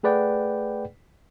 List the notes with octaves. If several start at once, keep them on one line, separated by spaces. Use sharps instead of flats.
A3 G#4 B4 D5 F#5 G5